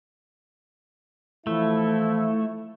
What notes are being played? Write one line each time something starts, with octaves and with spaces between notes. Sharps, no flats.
E3 F3 A3 E4